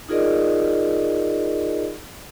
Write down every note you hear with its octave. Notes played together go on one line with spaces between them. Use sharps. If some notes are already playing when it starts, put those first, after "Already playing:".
D#4 F4 G#4 A#4 D5 D#5